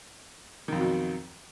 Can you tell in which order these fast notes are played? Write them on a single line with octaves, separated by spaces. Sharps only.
D#3 F2 F#3 B2